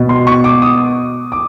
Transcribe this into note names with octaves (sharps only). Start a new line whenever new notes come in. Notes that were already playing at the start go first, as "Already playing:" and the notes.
Already playing: B2
C6
C#6
D6
D#6
D6